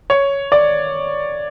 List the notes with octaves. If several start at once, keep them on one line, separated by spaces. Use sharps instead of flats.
C#5
D5